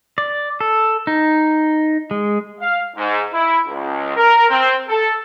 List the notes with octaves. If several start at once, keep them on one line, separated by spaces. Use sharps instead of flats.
D5
A4
D#4
G#3
F5
G#2
E4
C#2
A#4
C4
A4